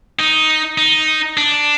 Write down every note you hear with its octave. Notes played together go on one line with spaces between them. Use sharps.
D#4
D#4
D4